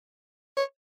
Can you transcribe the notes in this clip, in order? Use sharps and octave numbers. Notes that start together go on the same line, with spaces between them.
C#5